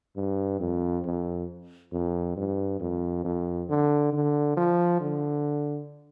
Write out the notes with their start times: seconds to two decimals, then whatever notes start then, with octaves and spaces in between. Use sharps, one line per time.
0.16 G2
0.60 F2
1.05 F2
1.93 F2
2.36 G2
2.80 F2
3.25 F2
3.69 D3
4.13 D3
4.57 F3
5.00 D3